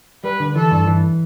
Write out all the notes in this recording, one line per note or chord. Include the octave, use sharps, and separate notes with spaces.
G3 B4
D3
E3 A4
G2
E3